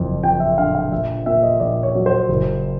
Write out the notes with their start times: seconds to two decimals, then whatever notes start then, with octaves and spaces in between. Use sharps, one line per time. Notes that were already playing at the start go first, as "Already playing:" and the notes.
Already playing: F#1 F2
0.23 F3 G5
0.40 E5
0.58 D3 F5
0.75 F5
0.92 A#1 E5
1.26 A#2 E5
1.43 D#5
1.60 A#1 D5
1.83 C#5
1.95 F#3
2.06 C5
2.29 F#1